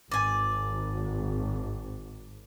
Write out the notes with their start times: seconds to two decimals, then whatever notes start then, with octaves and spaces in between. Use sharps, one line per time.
0.11 G#1 D5 G#5